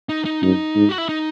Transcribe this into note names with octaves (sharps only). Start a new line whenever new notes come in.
D#4
D#4
F#2 D#4
G#2
F#4
E4
D#4